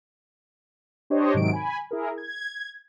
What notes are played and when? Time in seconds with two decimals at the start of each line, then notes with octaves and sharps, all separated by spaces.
1.10 D4 G4 C5 C#5 D#5
1.34 G#2 C3 D#3 F#3 D7
1.53 G#5 B5
1.91 E4 G#4 A#4
2.18 G#6